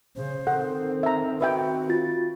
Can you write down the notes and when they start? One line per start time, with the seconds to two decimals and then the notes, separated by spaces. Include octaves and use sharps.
0.16 C#3 C5
0.47 D#3 C4 A4 F#5
1.03 E5 A#5
1.41 F#4 B4 E5 G5
1.89 F4 A6